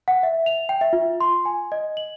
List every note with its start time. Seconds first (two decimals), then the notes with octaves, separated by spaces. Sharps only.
0.08 F#5
0.23 E5
0.46 F7
0.69 G5
0.81 E5
0.93 F4
1.21 C6
1.45 G#5
1.72 D#5
1.97 F#7